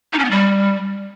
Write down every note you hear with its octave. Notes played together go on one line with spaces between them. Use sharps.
D#4
C#4
B3
G3